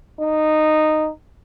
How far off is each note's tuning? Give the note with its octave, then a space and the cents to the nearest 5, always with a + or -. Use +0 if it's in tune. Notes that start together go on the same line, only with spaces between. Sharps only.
D#4 -10